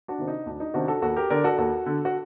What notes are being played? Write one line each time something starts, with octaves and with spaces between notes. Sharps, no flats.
D4 F#4
C3 D#3
D#4
D2 D4
D#4
C3 D#3 D4 F#4
F#4 A4
D#2 F#4 A4
G4 A#4
D3 A#4 D5
F#4 A4
D#2 F#4 A4
D3
F#4